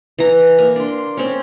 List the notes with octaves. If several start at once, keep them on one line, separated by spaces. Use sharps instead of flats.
E3 A#5
A#3
D4 C6
C4 C#4